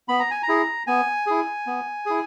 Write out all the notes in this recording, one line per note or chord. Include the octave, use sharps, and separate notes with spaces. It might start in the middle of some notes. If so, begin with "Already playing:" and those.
B3 B5
A#5
G#5
A#5
E4 G#4
B3 G#5
E4 G#4
B3
E4 G#4